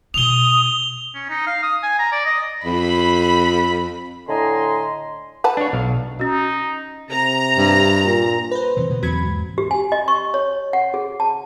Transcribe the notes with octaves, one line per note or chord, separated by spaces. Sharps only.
B2 E4 D#6 F7 G7
C#4
D#4
F5
D#6
G#5
A#5
D5
D#5
F2 B5
A2 D3 D#5 G#5 A#5 C6
B4 F#5 A5
D4 C#5
B1 F5
C#4 D#4 F#4
C3 A#5
G2
A#2
B4 C5
C3 E3 F#3
B2 D3 B3
E2 F#3 A#3 C4 B5 G#6
E2 G#2
G4
G#5
D#5
C#6
C#5
F#5
G#4
A5